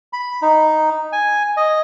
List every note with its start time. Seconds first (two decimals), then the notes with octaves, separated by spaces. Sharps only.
0.13 B5
0.42 D#4
1.13 G#5
1.57 D#5